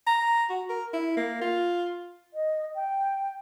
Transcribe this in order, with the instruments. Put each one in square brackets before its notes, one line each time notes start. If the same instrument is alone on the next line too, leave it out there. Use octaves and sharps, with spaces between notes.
[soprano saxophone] A#5
F#4
A#4
E4
A#3
F4
[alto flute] D#5
G5